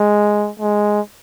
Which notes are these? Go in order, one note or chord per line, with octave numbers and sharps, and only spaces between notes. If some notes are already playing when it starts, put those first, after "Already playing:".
Already playing: G#3
G#3